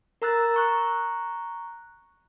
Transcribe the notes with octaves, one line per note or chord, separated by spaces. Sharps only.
A#4 A#5 E6 F#6 A6
A#5 C#6 F#6